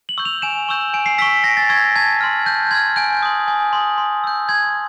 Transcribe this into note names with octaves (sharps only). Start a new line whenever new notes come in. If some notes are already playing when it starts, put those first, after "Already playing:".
F#7
C#6 E6 G6
F7
G#5 E7
C#6 E6 G6
G#5 D7
C7
C#6 E6 B6
G#5 A#6
A6
C#6 E6 G#6
A5 G#6
C6 F6
A5 G6
C6 F6 G#6
G#5 G6
C6 D#6
G#5
C6 D#6
C6
E6 G6
C6 G#6